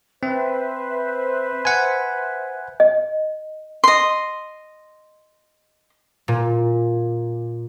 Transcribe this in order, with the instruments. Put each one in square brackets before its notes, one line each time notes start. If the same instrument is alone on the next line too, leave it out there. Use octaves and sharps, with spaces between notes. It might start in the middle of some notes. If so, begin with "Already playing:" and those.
[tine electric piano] C4 [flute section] B4 C5 E5
[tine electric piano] F#5 G#5
[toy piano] D#5
[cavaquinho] D#5 C6
[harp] A#2